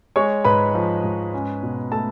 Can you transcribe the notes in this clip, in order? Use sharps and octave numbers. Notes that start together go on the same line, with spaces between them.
G#3 C#5 C#6
G#2 B4 B5
F3
G#2
C#4
B2
A3 A4 A5